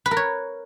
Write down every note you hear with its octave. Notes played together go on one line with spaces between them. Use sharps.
B4
A#4
C#5